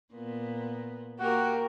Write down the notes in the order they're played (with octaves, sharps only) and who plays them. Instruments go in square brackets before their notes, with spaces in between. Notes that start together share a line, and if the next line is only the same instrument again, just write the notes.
[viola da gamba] A#2 B3
[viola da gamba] A#3 A#4 [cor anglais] F#4 [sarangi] G4